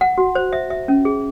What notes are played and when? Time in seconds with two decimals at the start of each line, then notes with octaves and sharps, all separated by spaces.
0.01 F#5
0.18 F#4
0.35 C5
0.53 E5
0.70 E5
0.88 C#4
1.05 G#4